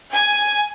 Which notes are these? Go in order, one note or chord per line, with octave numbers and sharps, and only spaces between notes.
G#5